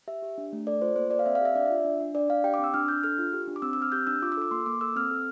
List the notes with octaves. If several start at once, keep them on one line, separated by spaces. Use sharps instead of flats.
G4 E5
G4
D4
A3
A4 D5
F4 C5
A#3 C5
A4 D5
F5
C4 E5
F5
G4 E5
D4 D5
F4 E5
D4
D4
D4 D5
D4 F5
G4 G5
D6
C4 E6
D4 F6
D4 G6
A4 F6
F4
G4
D4
D6
C4 E6
E6
C4 F6
G4 G6
D4 E6
F4 D6
E6
A4 D6
A#3 C6
A#3 D6
A4 E6
C4 F6
A4